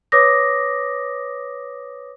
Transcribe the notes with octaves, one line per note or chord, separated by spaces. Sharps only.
B4 C#5 D6 D#6 A#6